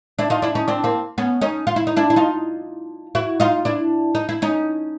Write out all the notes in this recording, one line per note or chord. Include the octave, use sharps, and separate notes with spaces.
D4 E4
D#4 F4
D4 E4
C#4 D#4
C4 D4
A#3 C4
B3 C#4
C#4 D#4
F4
E4
D#4
D4 E4
E4
D#4 F4
E4 F#4
D#4 F4
D4 E4
D#4
E4
C#4 D#4